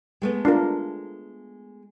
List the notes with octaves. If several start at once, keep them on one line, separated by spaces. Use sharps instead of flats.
G#3 A3 B3
D4 F4 A#4